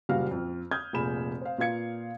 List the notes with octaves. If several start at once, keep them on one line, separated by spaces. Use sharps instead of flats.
F#1 A#2 G3 F#4 F5 F6
F2
D#6 F6 G6 G#6
F1 A#2 G#4 B5 E7
C5 F5
A#2 F4 B4 F5 G#6 C#7